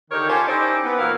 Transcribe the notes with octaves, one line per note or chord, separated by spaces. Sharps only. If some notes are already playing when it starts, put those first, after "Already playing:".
D3 D#3 D#4 G4 A#4 C#5
C#4 F4 G4 A4 C5
C#4 D#4 E4 G4 C5 D5
B3
A#2 E3 E4 F#4 A#4 F5